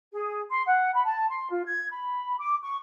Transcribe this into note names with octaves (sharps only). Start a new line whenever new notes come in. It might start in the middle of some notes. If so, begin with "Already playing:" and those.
G#4
C6
F#5
B5
A5
C6
F4
G#6
B5
D6
C#6